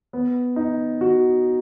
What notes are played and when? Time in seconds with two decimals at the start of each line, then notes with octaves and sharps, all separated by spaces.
0.13 B3
0.56 D#4
1.01 F#4